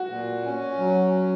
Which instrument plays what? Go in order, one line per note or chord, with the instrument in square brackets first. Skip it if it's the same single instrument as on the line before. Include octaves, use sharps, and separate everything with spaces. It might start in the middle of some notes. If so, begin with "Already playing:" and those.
Already playing: [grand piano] F#4
[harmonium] A#2
C#4
F#3
C#4